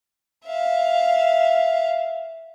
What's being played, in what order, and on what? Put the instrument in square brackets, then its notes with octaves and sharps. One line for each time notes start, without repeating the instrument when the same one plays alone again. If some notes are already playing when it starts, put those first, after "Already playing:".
[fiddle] E5 F5